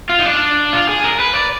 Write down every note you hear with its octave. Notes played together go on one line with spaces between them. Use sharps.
F4
D#4
D4
F4
G#4
A#4
B4
D5